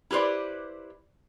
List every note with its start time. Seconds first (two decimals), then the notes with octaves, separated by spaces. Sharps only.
0.11 E4 G4 B4 C5 D5